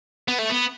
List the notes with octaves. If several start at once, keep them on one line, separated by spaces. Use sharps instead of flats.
B3
A3
B3